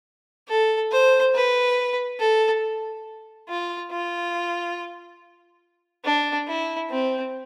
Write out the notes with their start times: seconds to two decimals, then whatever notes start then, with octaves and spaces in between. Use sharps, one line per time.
0.48 A4
0.92 C5
1.35 B4
2.19 A4
3.49 F4
3.91 F4
6.04 D4
6.48 E4
6.90 C4